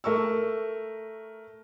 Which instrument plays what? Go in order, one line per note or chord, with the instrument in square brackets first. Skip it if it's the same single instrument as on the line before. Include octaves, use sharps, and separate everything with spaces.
[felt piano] A3 A#4 C#6 E6